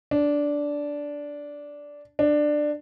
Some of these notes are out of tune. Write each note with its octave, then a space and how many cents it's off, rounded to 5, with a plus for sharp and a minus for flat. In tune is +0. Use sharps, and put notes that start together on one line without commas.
D4 -10
D4 +15